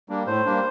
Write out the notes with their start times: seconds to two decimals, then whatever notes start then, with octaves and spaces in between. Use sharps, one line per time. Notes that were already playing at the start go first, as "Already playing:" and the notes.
0.09 G3 A#3 D4
0.27 A2 C5
0.45 G3 A#3 D4